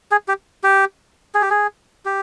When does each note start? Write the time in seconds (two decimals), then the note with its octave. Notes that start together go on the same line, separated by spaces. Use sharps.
0.11 G#4
0.28 G4
0.64 G4
1.35 G#4
1.42 G4
1.50 G#4
2.05 G4